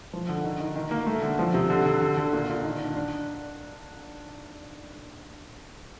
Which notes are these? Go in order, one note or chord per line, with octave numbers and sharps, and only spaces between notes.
F3
D3
D#3
D#3
D#3
A#3
A3
D3
F3
C3
D3
D3
D3
D3
A#2
A#2
D#3
D4
D4